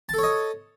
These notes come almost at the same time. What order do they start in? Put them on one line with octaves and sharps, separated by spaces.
A5 A4 C#5 D#5